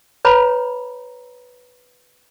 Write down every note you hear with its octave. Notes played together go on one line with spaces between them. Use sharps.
B4 C#5 A#5 B5